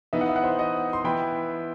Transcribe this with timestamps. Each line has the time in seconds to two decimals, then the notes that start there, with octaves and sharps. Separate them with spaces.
0.13 E3 B3 D#4 E5
0.21 F#5
0.29 E5
0.36 F#5
0.43 C5 E5
0.59 D#5 F#5
0.93 C6
1.04 E3 B3 E4 G5 B5